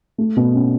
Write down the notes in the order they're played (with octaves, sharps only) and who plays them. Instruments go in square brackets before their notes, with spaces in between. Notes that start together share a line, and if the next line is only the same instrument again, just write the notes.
[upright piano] A3
B2
C#4